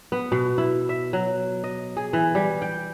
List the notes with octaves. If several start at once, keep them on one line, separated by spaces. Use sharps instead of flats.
B3
B2
E4
E5
F#3
D#5
G#4
E3
G3
G5